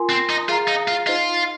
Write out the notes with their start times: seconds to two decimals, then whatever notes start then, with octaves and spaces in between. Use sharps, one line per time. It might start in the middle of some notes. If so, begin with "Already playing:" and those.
Already playing: F4 A#4 G#5 C6
0.09 C4
0.29 D#4
0.48 F4 G#4 F5 A#5
0.68 D#4
0.88 F4
1.06 D#4 F4 C5 D#5